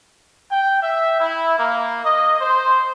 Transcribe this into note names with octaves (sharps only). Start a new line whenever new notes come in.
G5
E5
E4
A#3
D#5
C5